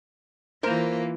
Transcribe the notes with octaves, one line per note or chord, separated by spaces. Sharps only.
E3 A#3 F4 A#4 C5 A#5